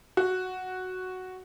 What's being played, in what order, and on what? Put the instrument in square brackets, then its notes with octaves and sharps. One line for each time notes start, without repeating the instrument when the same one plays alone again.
[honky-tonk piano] F#4